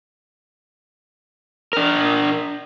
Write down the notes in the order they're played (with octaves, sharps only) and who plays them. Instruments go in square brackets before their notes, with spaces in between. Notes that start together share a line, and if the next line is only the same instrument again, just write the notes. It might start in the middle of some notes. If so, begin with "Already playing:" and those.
[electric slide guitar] D4 A#4